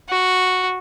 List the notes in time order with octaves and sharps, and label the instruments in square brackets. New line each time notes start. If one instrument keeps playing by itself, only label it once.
[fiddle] F#4